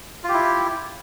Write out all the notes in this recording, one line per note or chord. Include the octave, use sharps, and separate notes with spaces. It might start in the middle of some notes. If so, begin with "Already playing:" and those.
E4 F4 G4